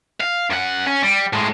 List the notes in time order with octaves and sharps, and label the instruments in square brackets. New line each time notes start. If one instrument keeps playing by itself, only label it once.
[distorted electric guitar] F5
F#2 F#5
C#4
G3
A2 G#3